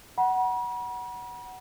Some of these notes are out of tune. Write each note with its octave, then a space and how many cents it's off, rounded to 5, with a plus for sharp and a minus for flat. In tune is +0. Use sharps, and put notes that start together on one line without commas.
F#5 +10 B5 -45